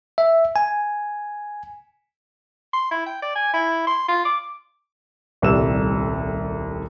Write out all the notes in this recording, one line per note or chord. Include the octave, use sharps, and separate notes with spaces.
E5
G#5
C6
E4
G5
D5
G#5
E4
C6
F4
D6
D#1 C2 G3 A3 E6 E7